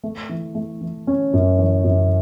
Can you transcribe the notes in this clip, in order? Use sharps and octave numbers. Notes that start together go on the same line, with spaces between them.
A3
E3
A3
E3
C#4
F#2
E3
F#2